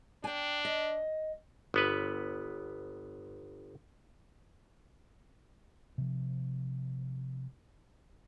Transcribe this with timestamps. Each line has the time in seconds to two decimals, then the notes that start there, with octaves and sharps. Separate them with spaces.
0.24 D4 G5 G#5
0.65 D#5
1.74 G1 B3 B4
5.98 C3 F3